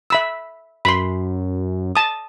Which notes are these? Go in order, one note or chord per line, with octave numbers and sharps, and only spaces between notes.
E5 B5 E6
F#2 B5 C6
A5 D#6